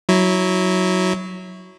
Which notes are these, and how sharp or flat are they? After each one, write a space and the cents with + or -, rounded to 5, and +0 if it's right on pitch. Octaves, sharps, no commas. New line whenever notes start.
F#3 +0 E4 -15